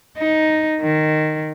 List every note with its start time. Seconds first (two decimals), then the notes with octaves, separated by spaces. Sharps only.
0.18 D#4
0.82 D#3